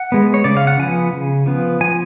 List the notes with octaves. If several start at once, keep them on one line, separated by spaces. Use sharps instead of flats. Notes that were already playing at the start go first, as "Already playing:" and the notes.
Already playing: F#5
G#3 B3
C#5
C#3 D5
F5
F#5
F3 B3 G#5
C#3
F3 B3
F3 G#5